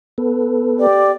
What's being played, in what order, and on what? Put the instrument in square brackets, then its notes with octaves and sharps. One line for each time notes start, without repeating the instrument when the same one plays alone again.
[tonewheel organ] B3 A4 B4
[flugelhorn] G4 [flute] D5